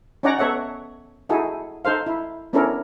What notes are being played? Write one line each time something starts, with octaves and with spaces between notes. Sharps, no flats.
C#4 D#4 C#5 D5 F#5 A#5
B3 A4 C#5 E5 F#5
D#4 E4 F#4 G#4 A4
D#4 A4 C5 F5
E4
B3 C#4 D4 E4 A4 A#4